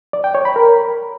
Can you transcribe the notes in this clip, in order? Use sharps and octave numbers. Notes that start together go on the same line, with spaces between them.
D5
G5
C#5
B5
A#4